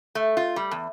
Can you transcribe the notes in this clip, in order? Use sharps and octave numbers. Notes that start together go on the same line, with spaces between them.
A3
F4
G3
E2